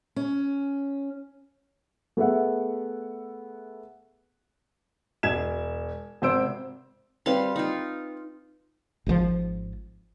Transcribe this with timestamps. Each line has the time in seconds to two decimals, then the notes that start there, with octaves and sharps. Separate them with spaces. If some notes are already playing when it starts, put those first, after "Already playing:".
0.16 C#4
2.17 A3 B3 G#4 E5 F#5
5.23 E1 G#6 E7
6.22 G#1 C3 C5 E6 D7
7.26 G3 C4 B4 F5 C6
7.56 D#4 F4
9.06 G#1 G#2 D#3 F3